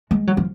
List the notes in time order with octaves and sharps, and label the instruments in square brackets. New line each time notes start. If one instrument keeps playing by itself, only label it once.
[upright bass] G#3
F#3
F3